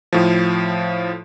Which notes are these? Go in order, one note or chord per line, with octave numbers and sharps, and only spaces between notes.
A2 F3